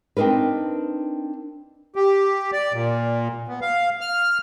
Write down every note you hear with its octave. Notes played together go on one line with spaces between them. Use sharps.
C4 D4 D#4 A#4 B4
G4
D5
A#2
B3
F5
F6